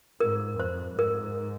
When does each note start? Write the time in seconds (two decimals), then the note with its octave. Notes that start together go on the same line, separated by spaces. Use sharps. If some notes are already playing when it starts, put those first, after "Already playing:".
0.20 G#2 A#4
0.59 F2 C5
0.99 G#2 A#4